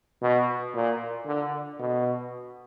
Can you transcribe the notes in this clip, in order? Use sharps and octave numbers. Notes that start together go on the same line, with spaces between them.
B2
A#2
D3
B2